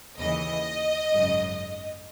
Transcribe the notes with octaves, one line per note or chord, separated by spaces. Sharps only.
D#2 C#3 E3 D#5
G#1 F#2 C#3